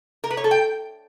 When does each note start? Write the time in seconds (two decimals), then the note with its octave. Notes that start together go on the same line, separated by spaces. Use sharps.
0.24 A#4
0.30 B4
0.37 C#5
0.44 A4
0.51 G5